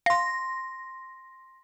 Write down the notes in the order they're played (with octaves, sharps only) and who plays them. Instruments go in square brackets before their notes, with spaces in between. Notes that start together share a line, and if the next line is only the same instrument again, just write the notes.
[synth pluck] F5 [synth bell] C6 A#6